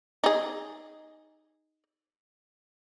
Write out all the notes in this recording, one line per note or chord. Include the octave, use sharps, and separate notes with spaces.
D#4 G#4